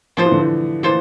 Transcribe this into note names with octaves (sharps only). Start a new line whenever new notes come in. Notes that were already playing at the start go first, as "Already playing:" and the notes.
F3 A#3 F4 A4 C5
E3
D3
E3
E3 A#3 F4 A4 C5